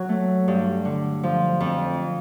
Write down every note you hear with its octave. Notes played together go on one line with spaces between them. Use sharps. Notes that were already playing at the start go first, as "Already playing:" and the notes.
Already playing: F#3
A3
G2
D3
F3
F2